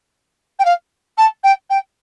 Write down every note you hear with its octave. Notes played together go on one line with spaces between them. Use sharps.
G5
F5
A5
G5
G5